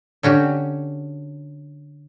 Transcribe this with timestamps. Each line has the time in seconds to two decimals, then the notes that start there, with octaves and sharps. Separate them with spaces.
0.23 D3 C#4 F#4 G4